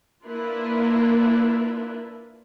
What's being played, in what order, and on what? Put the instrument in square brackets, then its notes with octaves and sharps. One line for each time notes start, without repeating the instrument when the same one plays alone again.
[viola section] A#3 D4 E4 F4 A#4 B4